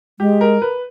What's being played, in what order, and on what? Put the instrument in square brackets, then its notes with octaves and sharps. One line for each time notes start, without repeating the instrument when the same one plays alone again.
[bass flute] G#3 [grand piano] G4
[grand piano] A#4
B4